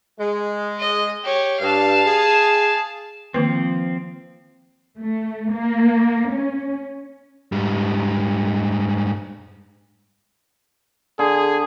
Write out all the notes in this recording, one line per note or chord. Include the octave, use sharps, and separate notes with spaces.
G#3
D#5
G4 C#5
G2 F5 A5
G#4
D#3 F3 A#3 C4 B4
A3
A#3
C#4
G#2 G3
D3 G#4